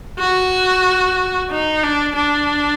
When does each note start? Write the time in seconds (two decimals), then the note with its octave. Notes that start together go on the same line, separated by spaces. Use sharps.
0.19 F#4
1.50 D#4
1.83 D4
2.16 D4